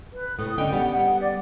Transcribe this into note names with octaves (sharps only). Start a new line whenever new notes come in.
B4
A2 C3 D#6
D3 C#4 D#5 G5
G3 B3 F#5
F#5
D5